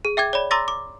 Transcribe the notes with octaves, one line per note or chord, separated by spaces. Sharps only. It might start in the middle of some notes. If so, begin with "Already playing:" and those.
G#4
E5 G5 D6 G#6
C#5 D5 B5
A#5 C6 D6 E6 A6 A#6
D6